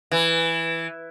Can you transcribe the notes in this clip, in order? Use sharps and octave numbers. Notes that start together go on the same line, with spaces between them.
E3